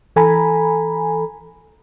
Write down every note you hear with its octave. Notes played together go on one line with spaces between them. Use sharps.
E3 A4 G#5 A#5 B5